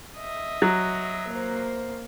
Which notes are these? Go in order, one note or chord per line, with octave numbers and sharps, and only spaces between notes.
D#5 E5
F#3
A#3 C5